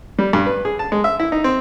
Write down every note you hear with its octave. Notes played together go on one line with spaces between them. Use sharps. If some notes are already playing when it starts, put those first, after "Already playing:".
G3
G2
B4
G#4
A5
G#3
E5
E4
D#4
C4